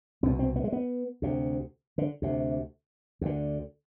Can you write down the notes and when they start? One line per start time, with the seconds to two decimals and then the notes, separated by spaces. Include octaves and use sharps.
0.23 C2 B2 C4
0.39 C4
0.56 B3
0.64 G#3
0.72 B3
1.22 D2 C3
1.98 D3
2.22 D2 C3
3.21 D2 D3